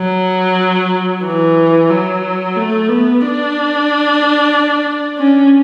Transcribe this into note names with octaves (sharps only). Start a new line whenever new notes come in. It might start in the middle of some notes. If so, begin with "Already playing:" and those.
Already playing: F#3
E3
F#3
A3
B3
D4
C#4